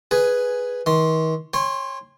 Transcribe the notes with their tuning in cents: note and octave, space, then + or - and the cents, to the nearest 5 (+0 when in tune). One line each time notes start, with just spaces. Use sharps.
G#4 +0 B4 +0 G#5 +5
D#3 +45 C6 +0
C#5 -20 G5 +40 C6 +0